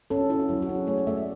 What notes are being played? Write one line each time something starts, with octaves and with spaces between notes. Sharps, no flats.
C#4 A4
F#4
C#4 E4
F#4
F#3 E4
F#4
C#4
G#4
A3 C#5
D5
A3 E5
D5